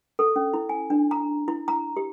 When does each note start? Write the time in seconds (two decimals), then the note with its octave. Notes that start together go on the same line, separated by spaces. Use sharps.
0.19 A4
0.36 C#4
0.54 E4
0.69 G#5
0.90 D4
1.11 A#5
1.48 E4
1.68 A#5
1.97 G4